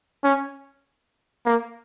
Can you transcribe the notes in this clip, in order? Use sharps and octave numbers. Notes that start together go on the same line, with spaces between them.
C#4
A#3